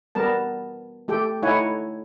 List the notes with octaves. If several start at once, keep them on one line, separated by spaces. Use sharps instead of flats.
G3 B3 A#4 A5
A3 G4 A4 G5
A3 D#4 E4 C#5 F#5 G#5